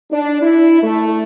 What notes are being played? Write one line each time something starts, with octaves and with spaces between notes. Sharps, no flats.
D4
E4
A3